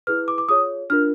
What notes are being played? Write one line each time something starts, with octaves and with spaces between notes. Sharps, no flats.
E4 G#4 B4 F6
D6
D6
F4 G#4 C#5 D#6
D4 F4 A#4 F6